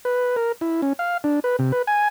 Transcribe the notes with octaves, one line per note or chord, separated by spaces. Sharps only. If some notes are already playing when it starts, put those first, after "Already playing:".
B4
A#4
E4
C#4
F5
D4
B4
C3
B4
G#5